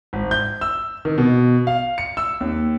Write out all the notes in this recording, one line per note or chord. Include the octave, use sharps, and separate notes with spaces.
G#1
G6
E6
D#3
B2
F5
C#7
E6
D#2